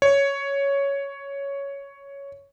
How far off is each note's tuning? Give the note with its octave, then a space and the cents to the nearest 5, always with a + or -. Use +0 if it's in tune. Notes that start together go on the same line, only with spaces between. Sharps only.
C#5 +5